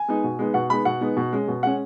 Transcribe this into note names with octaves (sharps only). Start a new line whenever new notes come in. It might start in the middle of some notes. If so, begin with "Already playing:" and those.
Already playing: G#5
G#3 B3 D#4
B2
G#3 B3 D#4
B2 F#5
G#3 B3 D#4 B5
B2 F#5
G#3 B3 D#4
B2
G#3 C#4
B2
G#3 C#4 F#5